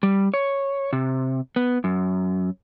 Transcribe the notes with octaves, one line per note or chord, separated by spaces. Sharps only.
G3
C#5
C3
B3
F#2